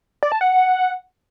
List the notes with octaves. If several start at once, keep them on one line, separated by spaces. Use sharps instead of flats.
D5
A5
F#5